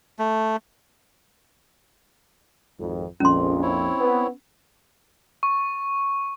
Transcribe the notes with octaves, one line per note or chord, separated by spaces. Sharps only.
A3
G#1 F2
A#1 F2 G#3 C#4 C6
C4 E4 C#5
B3
C#6